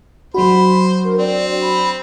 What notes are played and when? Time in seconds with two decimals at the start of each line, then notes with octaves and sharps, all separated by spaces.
0.34 F#3 D4 F#4 C5 B5
1.04 A#4
1.18 C4 D5
1.62 B5